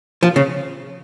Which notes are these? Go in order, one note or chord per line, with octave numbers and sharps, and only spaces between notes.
F3
C#3